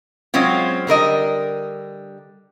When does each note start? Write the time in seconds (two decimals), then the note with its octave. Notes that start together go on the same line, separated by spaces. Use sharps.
0.34 F#3 G#3 C4 C#4 F4
0.87 D3 G3 A#4 D#5